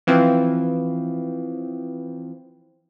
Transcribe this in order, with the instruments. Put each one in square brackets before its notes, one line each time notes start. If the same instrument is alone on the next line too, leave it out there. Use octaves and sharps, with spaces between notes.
[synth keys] E3 F3 C4